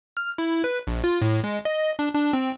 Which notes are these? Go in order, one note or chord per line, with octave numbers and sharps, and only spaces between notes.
F6
E4
B4
A#1
F4
A2
G#3
D#5
D4
D4
C4